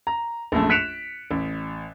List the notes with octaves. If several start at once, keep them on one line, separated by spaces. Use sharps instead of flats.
A#5
A#1 F#2 A3 A5
F#6 B6 C#7 D7 E7 F7
A1